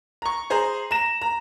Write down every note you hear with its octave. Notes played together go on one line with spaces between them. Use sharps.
A#5 C#6
G#4 C5 A#5
A#5 A#6 E7
A#5